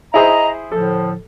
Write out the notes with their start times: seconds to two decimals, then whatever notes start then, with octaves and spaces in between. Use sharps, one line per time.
0.14 E4 G#4 C5 D#5 A#5
0.72 A2 D3 F3 A4